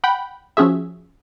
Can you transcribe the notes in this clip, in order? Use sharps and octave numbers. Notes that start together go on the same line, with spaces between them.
F#5 G5 B5
F3 C#4 F#4 G#4 E5